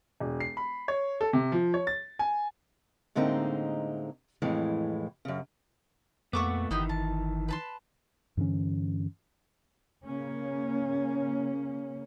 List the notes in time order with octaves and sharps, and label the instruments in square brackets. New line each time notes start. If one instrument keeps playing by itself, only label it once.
[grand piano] E1
C7
B5
C#5
A4
C3
F3
C#5
A6
G#5
[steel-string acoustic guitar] A2 D3 G#3 A#3 C4 D#4
F2 A2 E3 G#3
F#2 C#3
[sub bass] F2 [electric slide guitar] A#2 A3 B3 [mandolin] F#5 C#6 D6
[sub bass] G1 [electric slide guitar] D#3 E3 [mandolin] B3 D#4 G4
[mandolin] A5
B4 A5 C6
[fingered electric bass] G2 D3 E3 C#4
[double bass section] C#3 A#3 C#4